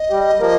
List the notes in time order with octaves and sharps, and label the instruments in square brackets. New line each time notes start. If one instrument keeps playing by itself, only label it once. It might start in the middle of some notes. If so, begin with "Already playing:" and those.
Already playing: [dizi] D#5
[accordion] G3
F3 A#3